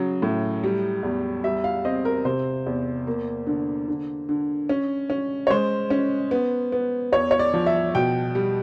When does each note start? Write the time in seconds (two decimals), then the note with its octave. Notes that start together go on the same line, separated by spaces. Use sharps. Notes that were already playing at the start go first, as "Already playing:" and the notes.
Already playing: C#3 F#3
0.22 A2
0.64 G3
1.03 E2
1.44 G3 E5
1.64 F5
1.85 C4 D#5
2.05 A#4
2.25 C3 C5
2.66 E2
3.07 A#3
3.47 D3
3.88 D3
4.29 D3
4.69 C#4
5.10 C#4
5.47 C#5
5.50 G#3 C5
5.90 C#4
6.31 B3
6.72 B3
7.12 E2 C#5
7.31 C#5
7.39 D5
7.54 F3
7.66 E5
7.95 B2 G5
8.35 G3